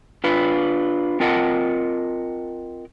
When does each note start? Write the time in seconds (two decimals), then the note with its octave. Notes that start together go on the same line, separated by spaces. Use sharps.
0.24 D4 F4 B4
1.20 C4 F4 A#4 D#5 F#5 A5